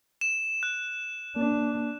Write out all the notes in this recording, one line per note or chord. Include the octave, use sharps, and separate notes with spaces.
E7
F#6
A#3 D4